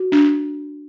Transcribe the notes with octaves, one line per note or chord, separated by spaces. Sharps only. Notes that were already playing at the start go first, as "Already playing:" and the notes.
Already playing: F#4
D4